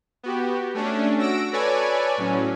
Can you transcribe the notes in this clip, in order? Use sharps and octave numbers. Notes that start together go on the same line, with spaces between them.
B3 F#4 G4
A3 C#4 D4
F#4 E6 A#6 D7
A4 B4 C#5 D5 G#5
A2 F#3 C#4